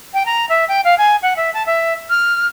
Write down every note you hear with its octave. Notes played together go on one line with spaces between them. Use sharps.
G5
A#5
E5
G5
F5
G#5
F#5
E5
A5
E5
F6